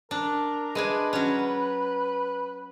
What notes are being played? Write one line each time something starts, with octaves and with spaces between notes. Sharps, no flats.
D4 A#4
G#3 D4 B4 G#5
F#3 C#4